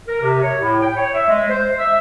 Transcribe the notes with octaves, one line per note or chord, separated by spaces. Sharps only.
A#4
C3
C#5
A2
G5
C#5
E5
G#3
C5
E5